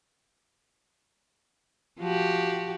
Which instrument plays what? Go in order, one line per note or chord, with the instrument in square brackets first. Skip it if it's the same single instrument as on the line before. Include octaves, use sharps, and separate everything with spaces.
[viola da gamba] F3 F#4 G4